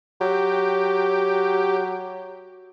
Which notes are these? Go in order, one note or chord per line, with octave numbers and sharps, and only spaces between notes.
F#3 G4